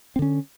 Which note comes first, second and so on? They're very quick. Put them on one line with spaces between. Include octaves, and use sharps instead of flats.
C4 D3 C#4